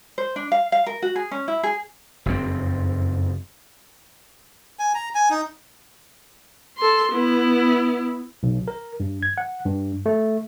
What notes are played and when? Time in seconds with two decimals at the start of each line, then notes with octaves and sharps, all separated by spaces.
0.18 C5
0.36 D4
0.52 F5
0.72 F5
0.86 A#4
1.02 F#4
1.16 G#4
1.31 C#4
1.48 E4
1.63 G#4
2.26 F#1 F2 C4
4.79 G#5
4.95 A#5
5.15 G#5
5.30 D#4
6.78 A4 C6
7.12 B3 E4
8.43 B1
8.68 A#4
9.00 G2
9.23 G#6
9.38 F#5
9.66 G2
10.06 A3